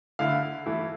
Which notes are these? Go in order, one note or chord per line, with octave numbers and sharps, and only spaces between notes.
D3 A3 E4 F5
E3 A3 E4